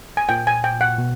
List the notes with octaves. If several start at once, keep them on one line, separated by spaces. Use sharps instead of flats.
G#5
A#2 G5
G#5
G5
F#5
B2